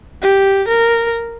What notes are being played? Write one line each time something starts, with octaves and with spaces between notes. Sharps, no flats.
G4
A#4